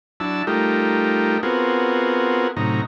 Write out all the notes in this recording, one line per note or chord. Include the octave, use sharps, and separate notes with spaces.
F#3 D4 E4 A5 E6
G3 A3 D#4 F4 G4 A#4
B3 C4 F4 F#4 G#4 A#4
A2 C3 F#3 C#4 D#4 A#5